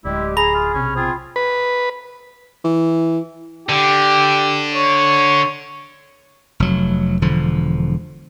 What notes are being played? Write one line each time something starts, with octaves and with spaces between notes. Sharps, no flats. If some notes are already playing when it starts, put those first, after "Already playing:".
D1 G3 G#3 E4 G4
G#4 A#5 B5
F4
B1 C3 C#4
C4 F4 G#4
B4
E3
D3 G4
C#5
F1 F#3
E1 D3 F3